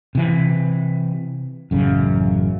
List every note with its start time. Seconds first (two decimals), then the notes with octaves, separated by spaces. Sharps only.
0.15 C3 E3
1.71 A1 F#2 C#3